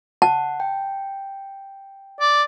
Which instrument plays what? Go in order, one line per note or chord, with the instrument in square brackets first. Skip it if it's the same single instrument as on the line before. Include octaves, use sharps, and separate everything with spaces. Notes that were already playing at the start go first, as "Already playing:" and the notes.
[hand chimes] F#5 [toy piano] A5
[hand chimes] G5
[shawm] D5